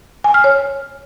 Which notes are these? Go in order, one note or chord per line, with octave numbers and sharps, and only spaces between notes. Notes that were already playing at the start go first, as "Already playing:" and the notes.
G#5
F6
C#5